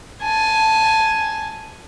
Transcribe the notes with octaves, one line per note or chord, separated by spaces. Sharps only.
G#5 A5